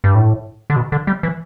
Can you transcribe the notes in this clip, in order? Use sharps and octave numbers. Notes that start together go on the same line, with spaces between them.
G2
A2
D3
B2
D3
G3
E3